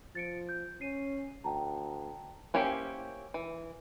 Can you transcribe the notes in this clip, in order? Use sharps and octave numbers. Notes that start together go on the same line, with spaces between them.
F3 A6 C#7 D7
G6
C#4 C7 D#7
D2 G5 A5 A#5
A#3 C#4 E4 G4 C5
E3